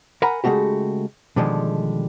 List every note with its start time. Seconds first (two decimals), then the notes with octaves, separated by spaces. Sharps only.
0.22 A#4 F#5 G#5 A#5 B5
0.44 C#3 G#3 A3 F#4 G4
1.36 B2 D3 D#3 F3 G3 G#3